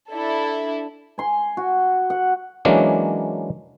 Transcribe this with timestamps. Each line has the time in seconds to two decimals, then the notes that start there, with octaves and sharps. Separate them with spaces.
0.12 D4 E4 A4
1.18 G#5 C6
1.57 F#4
2.10 F#5
2.65 E3 F#3 G#3 A#3 C#4 D4